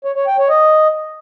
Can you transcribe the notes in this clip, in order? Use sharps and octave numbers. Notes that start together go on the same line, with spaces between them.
C#5
C#5
G5
C#5
D#5